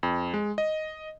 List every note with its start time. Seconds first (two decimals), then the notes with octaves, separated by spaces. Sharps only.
0.03 F2
0.34 G#3
0.58 D#5